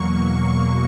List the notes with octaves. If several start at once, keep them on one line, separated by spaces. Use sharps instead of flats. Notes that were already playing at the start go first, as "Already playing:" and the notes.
Already playing: E2 B2 F#3 A#3 C#6